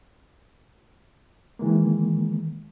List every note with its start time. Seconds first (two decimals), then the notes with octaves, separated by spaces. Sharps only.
1.59 D#3 E3 G#3 A#3